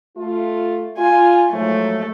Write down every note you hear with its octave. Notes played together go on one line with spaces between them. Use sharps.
A3 F4
F4 G#5
G#2 F3 F#3 A3